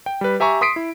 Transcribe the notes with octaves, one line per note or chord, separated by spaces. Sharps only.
G5
G3 B4
G4 E5 G#5 A#5 C#6
C6 D#6 B6 C7 D7
E4